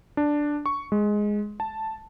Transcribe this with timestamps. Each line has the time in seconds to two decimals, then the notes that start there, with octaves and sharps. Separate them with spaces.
0.17 D4
0.66 C#6
0.92 G#3
1.60 A5